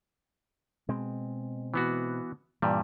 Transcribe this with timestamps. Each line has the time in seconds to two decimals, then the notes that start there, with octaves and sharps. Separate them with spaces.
0.89 B2 G#3 C4
1.74 E3 B3 F#4
2.62 G2 A#2 E3 G3